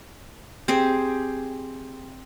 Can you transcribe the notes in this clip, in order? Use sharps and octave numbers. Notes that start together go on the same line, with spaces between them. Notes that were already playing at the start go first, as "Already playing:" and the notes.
C4 G4 G#4